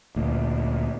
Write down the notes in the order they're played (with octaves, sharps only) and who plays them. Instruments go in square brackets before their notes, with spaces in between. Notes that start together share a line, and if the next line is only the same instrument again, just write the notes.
[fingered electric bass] D2 A#2